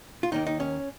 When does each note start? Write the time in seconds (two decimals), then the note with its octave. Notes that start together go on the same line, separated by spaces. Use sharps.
0.23 F4
0.32 D#2 D#3 A#3 D#4
0.47 D#4
0.60 C#4